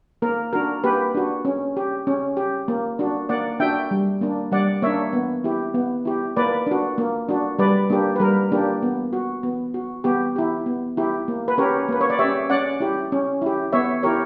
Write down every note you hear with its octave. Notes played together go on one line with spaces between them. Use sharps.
A#3 A#4
D4 F#4 A#4
A#3 G4 B4
D4 F#4
C#4
G4
C#4
G4
A#3
D4 F#4
A#3 D5 F#5
D4 F#4 E5 G5
G3
A#3 D4
G3 D5 F#5
A#3 D4 C#5 E5
B3
E4 G4
B3
E4 G4
A#3 B4 D5
D4 F#4
A#3
D4 F#4
G3 B4 D5
A#3 D4 G4
B4
G3 A#4
A#3 D4 G4
B3
F#4
B3
F#4
B3 G4
E4 G4
B3
E4 G4
A#3
B4
C#4 G4 A#4 C#5
A#3 B4
C#5
D5
G4 C#5 E5
C#4
C#4 D5 F#5
E4 G4
C#4
E4 G4
B3 C#5 E5
E4 G4 A#4 C#5